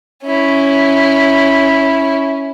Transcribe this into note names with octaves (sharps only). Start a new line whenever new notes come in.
C#4 E4